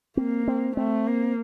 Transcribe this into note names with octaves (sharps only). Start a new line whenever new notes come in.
A#3 C4
C4
A3 C4
A#3